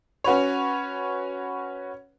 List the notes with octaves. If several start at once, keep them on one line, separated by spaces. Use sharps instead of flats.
C#4 F#4 B4 C#5